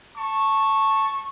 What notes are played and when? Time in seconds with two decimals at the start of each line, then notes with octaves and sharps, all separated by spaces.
0.17 A5 C#6